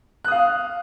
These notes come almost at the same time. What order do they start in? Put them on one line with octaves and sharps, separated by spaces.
F#6 D#6 F5